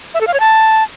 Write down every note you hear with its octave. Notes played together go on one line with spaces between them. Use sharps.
E5
A4
F5
C#5
A5